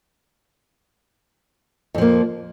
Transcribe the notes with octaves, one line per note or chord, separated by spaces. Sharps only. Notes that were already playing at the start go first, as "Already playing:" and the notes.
F2 F3 A#3